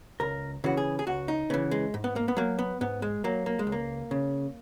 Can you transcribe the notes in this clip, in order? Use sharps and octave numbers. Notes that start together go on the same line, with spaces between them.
C#2 A#4
C#3 E3 F#4
G#4
G#4
C#2 F#4
D#4
C#3 E3 B3
G#3
G#2
B3
A#3
B3
F#3 A#3
B3
G#2 B3
G#3
F#3 A#3
A#3
G#3
C#2
A#3
C#3